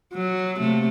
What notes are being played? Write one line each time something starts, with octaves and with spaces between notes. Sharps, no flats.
F#3
C3 A3 A#3